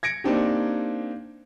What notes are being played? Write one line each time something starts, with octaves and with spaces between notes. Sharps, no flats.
G#6 A#6 C#7 D7
A#3 C4 D4 D#4 G4